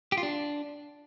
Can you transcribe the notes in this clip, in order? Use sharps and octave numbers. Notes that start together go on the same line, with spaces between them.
G4
F4
D4